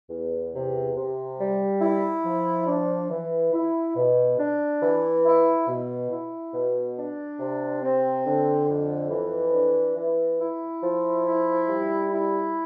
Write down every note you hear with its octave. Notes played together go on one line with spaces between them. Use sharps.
E2
C3
C3
G3
E4
F3
D4
E3
E4
B2
D4
E3
E4
B2
E4
B2
D4
C3
C4
D3
F2
E3
D4
E3
E4
F3
E4
G3
E4